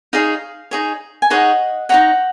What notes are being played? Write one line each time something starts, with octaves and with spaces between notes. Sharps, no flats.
D#4 G#4 C#5 F5
D#4 G#4 C#5
G#5
D#4 G#4 C#5 D#5 F#5
D#4 G#4 C#5 F#5 A#5